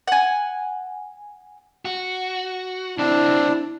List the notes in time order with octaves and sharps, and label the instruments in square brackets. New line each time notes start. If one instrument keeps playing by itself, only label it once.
[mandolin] F#5 G#5
[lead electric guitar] F#4
[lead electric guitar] C#2 C4 [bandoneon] D4 [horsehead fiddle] E4